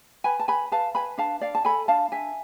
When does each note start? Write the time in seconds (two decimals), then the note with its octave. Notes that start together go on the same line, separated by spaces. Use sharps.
0.24 B4 G#5 B5
0.40 A5
0.48 B4 G#5 B5
0.72 B4 F5 A5
0.95 B4 G#5 B5
1.18 D4 F5 A5
1.41 D4 D5 F5
1.55 A5
1.65 A4 G#5 B5
1.88 D4 F5 A5
2.12 D4 E5 G#5